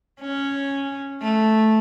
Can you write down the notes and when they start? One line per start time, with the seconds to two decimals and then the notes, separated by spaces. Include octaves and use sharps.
0.21 C#4
1.21 A3